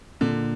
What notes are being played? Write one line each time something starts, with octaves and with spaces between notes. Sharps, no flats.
A#2 D3